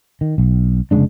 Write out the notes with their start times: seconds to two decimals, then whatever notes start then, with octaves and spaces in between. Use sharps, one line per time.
0.21 D#3
0.38 B1
0.91 F1 C#3 G#3 D4